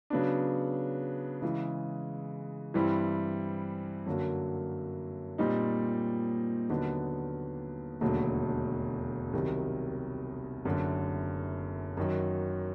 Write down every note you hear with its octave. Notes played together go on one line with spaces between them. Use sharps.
C#3 F#3 B3 D4
C#3 E3 G#3
G2 E3 G3 C4 E4
F#2 D3 F#3 A#3
A#2 G3 C4 D#4
D#2 D3 F#3 B3 D#4
E1 D#2 D3 F#3 A3
C2 C3 D#3 F#3
F#1 F#2 D3
F#2 D#3 F#3